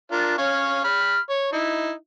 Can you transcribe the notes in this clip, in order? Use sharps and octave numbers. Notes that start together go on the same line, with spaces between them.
D4 F4 A#4
C#4 C#5 F5
B5 F6
C#5
D#4 E4